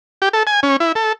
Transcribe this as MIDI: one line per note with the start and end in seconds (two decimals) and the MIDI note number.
0.22 0.29 67
0.33 0.43 69
0.47 0.60 80
0.63 0.77 61
0.80 0.92 64
0.95 1.13 69